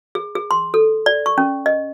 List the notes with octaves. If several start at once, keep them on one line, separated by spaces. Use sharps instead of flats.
G#4
G#4
C6
A4
D5
C#6
C#4
D#5